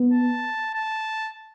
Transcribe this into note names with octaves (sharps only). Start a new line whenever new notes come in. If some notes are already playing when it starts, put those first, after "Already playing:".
Already playing: B3
A5
A5